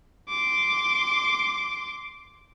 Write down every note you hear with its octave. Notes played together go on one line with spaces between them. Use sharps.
C6 D6